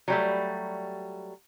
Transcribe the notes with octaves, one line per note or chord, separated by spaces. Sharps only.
F#3 G3 A3